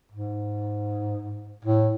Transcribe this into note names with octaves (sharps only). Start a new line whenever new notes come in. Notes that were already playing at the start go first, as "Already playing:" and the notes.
G#2
A2